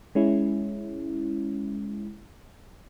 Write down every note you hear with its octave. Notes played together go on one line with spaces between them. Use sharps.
G#3 C#4 E4